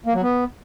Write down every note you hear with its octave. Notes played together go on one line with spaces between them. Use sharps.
A#3
F#3
B3